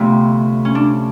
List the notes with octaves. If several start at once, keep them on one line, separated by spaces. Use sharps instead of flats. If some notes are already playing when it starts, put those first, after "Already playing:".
Already playing: D2 C3 F3 B3
C#4
D4